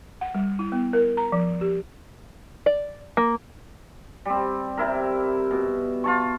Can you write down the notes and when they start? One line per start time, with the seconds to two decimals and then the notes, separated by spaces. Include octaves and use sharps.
0.21 F#5
0.35 G3
0.59 E4
0.72 B3
0.93 A#4
1.17 A#5
1.32 F3
1.61 G4
2.66 D5
3.17 A#3
4.25 G3 C4
4.77 C3 E4 A#4
5.51 B2
6.04 F4 A5 C#6